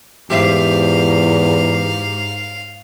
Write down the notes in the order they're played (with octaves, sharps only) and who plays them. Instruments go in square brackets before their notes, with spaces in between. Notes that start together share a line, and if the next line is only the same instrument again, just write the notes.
[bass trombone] E2 [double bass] G#2 [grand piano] G4 C5 E5 [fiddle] F5